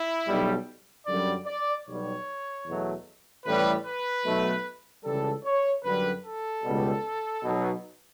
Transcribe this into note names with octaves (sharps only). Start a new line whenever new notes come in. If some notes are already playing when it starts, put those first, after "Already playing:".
Already playing: E4
B1 B2 G3
F#2 D3 G3 D5
D5
B1 B2 G3 C#5
E2 B2 F#3 A3
A1 A2 G3 B4
B4
B1 B2 A3
C#2 C#3 E3 G3 A4
C#5
F#2 D3 G3 B4
A4
C#2 B2 G3
B1 B2 F#3